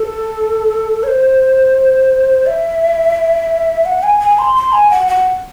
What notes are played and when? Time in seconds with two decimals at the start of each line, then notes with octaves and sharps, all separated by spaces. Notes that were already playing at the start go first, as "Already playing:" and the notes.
Already playing: A4
1.03 C#5
1.08 C5
2.46 E5
3.86 F#5
4.03 G#5
4.20 G#5
4.39 C6
4.56 C6
4.72 G#5
4.91 F#5
5.07 F#5